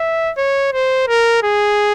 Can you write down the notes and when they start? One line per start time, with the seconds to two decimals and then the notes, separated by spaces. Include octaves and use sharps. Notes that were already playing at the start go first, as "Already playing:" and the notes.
Already playing: E5
0.38 C#5
0.73 C5
1.08 A#4
1.43 G#4